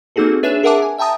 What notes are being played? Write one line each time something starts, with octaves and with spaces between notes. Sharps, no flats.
A#3 C4 D#4 F#4 G#4 A4
D4 G#4 B4 C#5 E5 E7
G#4 A#4 E5 F#5 A5 D6
G#5
E5 G5 A5 A#5 D#6